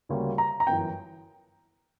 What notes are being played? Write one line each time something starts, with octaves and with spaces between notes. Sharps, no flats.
D2 C#3 G3 A#3 C#4
A#5
A#5
G1 F#2 E3 G5